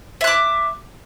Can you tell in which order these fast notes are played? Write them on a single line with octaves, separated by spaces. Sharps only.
E5 F#6 D6